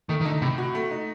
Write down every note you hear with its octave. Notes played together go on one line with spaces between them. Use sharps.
D#3 A3
D#3
D3 D#4
A2 C3
F#4
A3
D#4